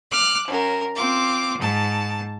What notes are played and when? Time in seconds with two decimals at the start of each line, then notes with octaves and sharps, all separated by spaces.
0.11 D6 F6 F#6
0.48 F#2 A#4
0.95 C4 F4 D6
1.58 G#2 A5